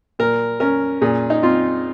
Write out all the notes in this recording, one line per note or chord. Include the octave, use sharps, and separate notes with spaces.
A#2 A#4
C#4 A#4
A#2 G#4
D#4
C4 F4